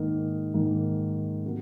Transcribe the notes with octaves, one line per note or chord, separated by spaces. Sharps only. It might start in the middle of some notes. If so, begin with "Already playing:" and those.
Already playing: G#2 D#3 A#3 D#4 A#4
G#2 D#3 A#3 D#4 A#4
C3 F#3 A#3